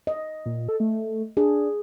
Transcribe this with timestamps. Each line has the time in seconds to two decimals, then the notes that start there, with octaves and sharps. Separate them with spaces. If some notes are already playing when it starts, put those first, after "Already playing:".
0.07 D#5
0.46 A#2
0.69 A4
0.80 A3
1.37 D4 G#4